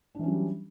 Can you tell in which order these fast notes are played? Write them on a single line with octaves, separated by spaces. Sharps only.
D4 E3 C#4 F#3 G3